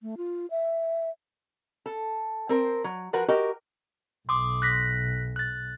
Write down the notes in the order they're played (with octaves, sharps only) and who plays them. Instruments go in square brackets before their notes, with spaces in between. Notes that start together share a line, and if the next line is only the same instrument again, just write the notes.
[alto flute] A3
F4
E5
[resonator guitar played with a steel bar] A4
C4 A#4
F#3
F3 F#4 A#4 B4
F#4 G4 A#4 D#5
[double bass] B1 [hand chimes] C6 D6 D#6
[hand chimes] F#6 A#6 B6
F#6 A6